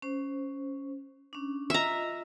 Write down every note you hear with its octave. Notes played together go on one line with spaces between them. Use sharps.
C#4 C5
C#4 D4
F4 D#5 E5 A#5